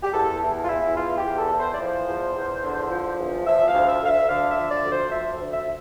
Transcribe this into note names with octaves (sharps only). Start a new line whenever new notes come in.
G4
E2 A4
E3
F4
E2 E4
E3 F4
G4
E2
A4
E3
C5
D5
F3
C5
E2
E2
D3
F3
E2
F3 E5
F5
D2
E5
D2 F5
E5
D3 F5
E5
F3
D5
D2
C5
F3 E5
D2
E5